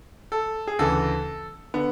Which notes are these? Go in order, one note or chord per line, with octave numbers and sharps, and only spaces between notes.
A4
G#4
D2 C#3 E3 A4
D3 B3